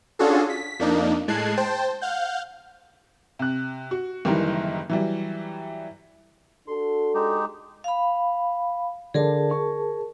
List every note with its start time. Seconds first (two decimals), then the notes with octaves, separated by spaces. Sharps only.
0.19 C#4 D4 F4 F#4 G#4 A4
0.49 B6
0.79 F2 A#3 D4 D#4
1.28 A2 G#3 A5 F#6 G#6 C7
1.57 C5 G5 A5
2.01 F5 F#5 G6
3.39 C3 F#6
3.91 F#4
4.25 F#1 D#3 E3 G3 E4 A#4
4.90 E3 F#3 G3
6.67 D4 F#4 A4 C6
7.14 G#3 D#4 G4
7.84 F5 B5
9.14 D3 G#4 A#4 D5 A5
9.51 C#6